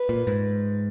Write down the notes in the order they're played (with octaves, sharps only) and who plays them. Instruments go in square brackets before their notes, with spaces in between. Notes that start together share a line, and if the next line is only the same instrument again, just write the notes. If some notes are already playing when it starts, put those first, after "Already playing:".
Already playing: [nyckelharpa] B4
[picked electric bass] A#2
G#2